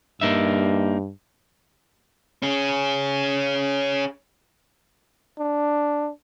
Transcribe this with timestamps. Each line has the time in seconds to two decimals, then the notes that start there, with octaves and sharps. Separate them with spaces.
0.21 G2 A#3 D#4 E5
2.42 C#4 G#4
5.39 D4